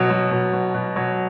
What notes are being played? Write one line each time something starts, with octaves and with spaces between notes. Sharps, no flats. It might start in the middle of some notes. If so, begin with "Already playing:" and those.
Already playing: B2 F#3
F#3
B2
B2
B2
F#3